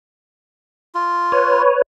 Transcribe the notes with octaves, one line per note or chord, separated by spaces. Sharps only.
F4
B4 C#5